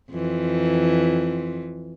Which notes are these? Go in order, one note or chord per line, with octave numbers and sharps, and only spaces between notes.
F2 E3